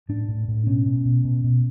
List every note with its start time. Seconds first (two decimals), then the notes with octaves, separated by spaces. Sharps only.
0.09 A2 D4
0.28 A2
0.48 A2
0.66 B2 C#4
0.86 B2
1.05 B2
1.24 B2
1.44 B2